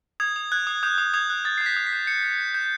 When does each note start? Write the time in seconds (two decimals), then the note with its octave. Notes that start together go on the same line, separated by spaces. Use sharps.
0.20 D#6 G#6
0.36 D#6
0.52 F#6 G#6
0.67 D#6
0.83 D#6 G6
0.98 D#6
1.14 D#6 G#6
1.30 F#6
1.45 D#6 A6
1.58 C7
1.61 G6
1.66 B6
1.76 D#6
1.87 B6
1.93 G6
2.07 G6 C#7
2.23 G6
2.39 G6
2.54 G6